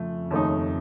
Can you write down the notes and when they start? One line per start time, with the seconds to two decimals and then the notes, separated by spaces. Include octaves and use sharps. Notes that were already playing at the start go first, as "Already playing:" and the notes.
Already playing: F2 C#3 A3
0.31 D#2 C#3 A3 D#4